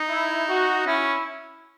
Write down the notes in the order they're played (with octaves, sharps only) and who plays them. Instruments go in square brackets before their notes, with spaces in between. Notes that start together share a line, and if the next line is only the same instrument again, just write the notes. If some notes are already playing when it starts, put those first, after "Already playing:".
Already playing: [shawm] D#4
[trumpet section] E4
F#4
[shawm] C#4 [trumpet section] E4